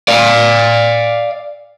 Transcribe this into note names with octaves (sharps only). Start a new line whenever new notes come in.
D5 F5